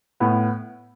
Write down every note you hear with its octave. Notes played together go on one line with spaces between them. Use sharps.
A2 B3